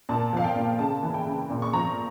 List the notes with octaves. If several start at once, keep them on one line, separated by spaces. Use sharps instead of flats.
A#2 A5
F3 F5
G5
A#2
C#3 A5
E3
G5
C#3
A#2
C#6
F3 A#5